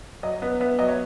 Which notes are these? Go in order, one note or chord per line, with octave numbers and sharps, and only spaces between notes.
F#3 D#5
B3
B3 E5
F#3 D#5
C#5